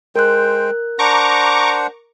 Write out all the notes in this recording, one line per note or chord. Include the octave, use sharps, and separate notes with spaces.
G#3 A#4 C5 G5 F#6
D4 C5 F#5 A#5 C#6 D6